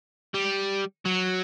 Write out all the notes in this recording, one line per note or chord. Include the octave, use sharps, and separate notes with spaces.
G3
F#3